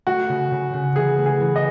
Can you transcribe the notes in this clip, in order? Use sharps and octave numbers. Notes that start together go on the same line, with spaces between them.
A3 F#4
C#3
C#3
C#3
E3 G#4
A3
G#4
E3
D#5